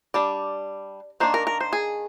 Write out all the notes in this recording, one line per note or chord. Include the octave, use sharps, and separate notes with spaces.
G3 D4 D5
D#3 A#3 D4 C5
A#4
A#4
C5
G#4